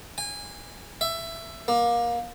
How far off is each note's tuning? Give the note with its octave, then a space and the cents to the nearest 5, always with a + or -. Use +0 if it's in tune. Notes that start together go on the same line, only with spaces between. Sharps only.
G#5 -25
E5 +15
A#3 +25